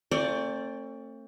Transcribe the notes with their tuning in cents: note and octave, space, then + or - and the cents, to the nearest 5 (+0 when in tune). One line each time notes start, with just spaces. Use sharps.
A3 +35 C4 +45 D5 +0